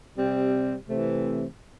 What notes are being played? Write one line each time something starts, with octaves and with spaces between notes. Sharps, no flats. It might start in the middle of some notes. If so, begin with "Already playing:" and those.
C3 G3 C4
C3 E3 A3 C4